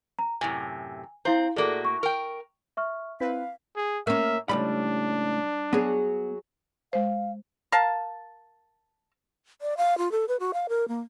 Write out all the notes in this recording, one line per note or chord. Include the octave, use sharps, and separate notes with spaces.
A#5
F#2 A2 C3 G#5
C4 E4 C5 F5 A#5
A2 A#3 F#4 G#4 A4 D5
C#6
A#4 G5
E5 C#6 F6
C4 E4 B4 F5 B6
G#4
A#3 C#4 E5
C#2 A2 G3 D4 B5
F#3 B3 G#4
G#3 C5 F5
A#4 F5 A5
D5
F5
F4
A4
B4
F#4
F5
A#4
A#3